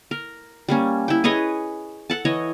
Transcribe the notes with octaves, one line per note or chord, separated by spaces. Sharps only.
A#4
G3 A#3 C#4
E4 G5
G#4 B4 C#5 D#5
A4 F#5 A5
E3 C#5 D#5